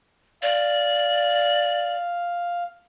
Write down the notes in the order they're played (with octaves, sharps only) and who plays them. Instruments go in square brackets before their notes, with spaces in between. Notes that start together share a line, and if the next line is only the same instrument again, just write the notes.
[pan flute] D5 [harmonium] F5